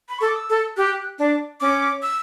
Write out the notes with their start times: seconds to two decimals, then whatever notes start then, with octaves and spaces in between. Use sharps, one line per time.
0.09 B5
0.19 A4 C#6
0.26 D6
0.36 E6
0.50 A4
0.77 G4 F#6
1.19 D4
1.60 C#4 D6
2.02 E6